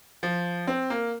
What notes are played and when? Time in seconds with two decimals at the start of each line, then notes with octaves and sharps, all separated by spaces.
0.23 F3
0.67 C4
0.90 A#3